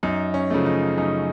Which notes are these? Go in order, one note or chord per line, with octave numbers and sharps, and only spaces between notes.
F#2 D#4
C#4
C#3 F3 A3
D#4
F#2 D#4